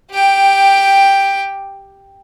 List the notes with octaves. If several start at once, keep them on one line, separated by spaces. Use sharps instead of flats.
G4 G5